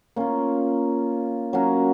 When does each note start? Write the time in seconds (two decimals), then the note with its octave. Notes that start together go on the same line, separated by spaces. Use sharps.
0.16 A#3 C#4 F4
1.53 F#3 A#3 C#4 F#4